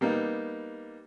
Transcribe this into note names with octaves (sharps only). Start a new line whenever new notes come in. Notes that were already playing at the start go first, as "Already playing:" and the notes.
G3 A#3 B3 D#4